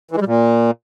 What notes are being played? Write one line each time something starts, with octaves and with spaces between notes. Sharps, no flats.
E3
G#3
G3
A#2